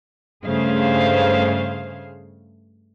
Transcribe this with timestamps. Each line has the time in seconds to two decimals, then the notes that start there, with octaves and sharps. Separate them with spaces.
0.45 G2 C#3 A3 G#4 C5 F5